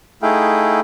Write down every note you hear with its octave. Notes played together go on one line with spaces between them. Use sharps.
A3 D#4 E4 G#4 F5 G5